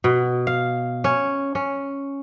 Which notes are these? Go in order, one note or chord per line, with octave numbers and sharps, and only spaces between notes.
B2
F5
C#4
C#4